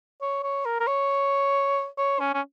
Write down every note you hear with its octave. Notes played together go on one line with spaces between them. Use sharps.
C#5
C#5
A#4
A#4
C#5
C#5
C#4
C#4